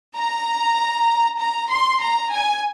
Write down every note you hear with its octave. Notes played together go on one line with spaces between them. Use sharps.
A#5
A#5
C6
A#5
G#5